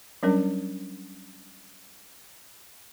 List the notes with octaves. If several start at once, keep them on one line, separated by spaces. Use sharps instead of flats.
F#3 G3 C#4 D4 A#4